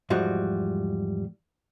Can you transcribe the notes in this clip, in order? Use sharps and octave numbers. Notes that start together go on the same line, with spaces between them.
E2 G#2 F3 G3 F#4